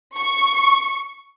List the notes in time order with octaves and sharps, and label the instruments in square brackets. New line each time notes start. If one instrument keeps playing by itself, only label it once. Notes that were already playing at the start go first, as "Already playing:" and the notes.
[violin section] C#6